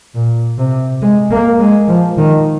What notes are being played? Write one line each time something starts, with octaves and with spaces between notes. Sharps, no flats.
A#2
C3
G#3
A#3
G#3
F3
D#3